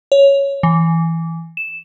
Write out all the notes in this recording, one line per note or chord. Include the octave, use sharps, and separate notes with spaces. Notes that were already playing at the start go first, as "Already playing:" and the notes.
C#5
E3
E7